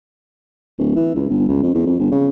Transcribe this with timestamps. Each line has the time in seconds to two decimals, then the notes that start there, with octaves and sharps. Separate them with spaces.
0.79 D1
0.96 E3
1.15 C#2
1.29 G1
1.48 C#2
1.63 F2
1.74 E2
1.86 F2
1.99 G1
2.12 C#3